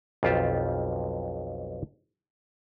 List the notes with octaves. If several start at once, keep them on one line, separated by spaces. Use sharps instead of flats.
B1 F2 F4 G4 A5